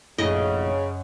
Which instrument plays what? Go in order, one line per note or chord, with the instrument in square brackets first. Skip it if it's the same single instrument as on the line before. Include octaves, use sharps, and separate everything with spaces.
[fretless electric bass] A#1 A2 [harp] F#2 [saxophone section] C#3 [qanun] D#5